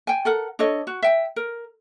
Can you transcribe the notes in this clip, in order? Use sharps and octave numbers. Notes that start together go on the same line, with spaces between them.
G5 G#5
A4 A#4 F#5
D4 A4 C#5 D#5
F#4
E5 G5
A#4